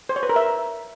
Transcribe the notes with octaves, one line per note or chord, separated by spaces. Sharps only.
C5
C#5
B4
A#4
E5